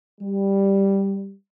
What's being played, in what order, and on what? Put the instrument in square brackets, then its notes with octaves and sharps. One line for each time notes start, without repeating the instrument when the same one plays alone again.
[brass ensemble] G3